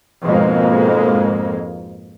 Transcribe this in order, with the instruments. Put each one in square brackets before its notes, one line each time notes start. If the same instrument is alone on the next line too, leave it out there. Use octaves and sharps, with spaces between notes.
[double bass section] F2 G#2 B2 G#3 A#3